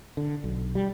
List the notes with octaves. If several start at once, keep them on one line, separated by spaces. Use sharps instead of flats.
D3
B1
G3